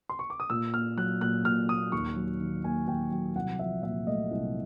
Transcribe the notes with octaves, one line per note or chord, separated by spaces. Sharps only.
C6
C#6
D6
D#6
A#2 E6
A#3 F6
F#3 F#6
A#2 F#6
A#2 F6
A#3 D#6
D#2 C#6
F#3
D#3
A#3 G#5
D#2 G5
F#3 G5
C2 F#5
F3 E5
A#2 E5
A3 D#5
C2